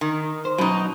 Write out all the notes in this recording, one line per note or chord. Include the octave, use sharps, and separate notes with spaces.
D#3
C5
B2 F#3 C#4 D#4